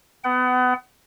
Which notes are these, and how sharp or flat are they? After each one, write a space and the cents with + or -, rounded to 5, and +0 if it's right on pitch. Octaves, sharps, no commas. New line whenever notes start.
B3 +30 F#5 +35